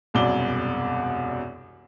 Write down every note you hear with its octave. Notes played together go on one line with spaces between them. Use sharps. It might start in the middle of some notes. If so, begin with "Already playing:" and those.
E1 C2 F#2 B2 D5 G7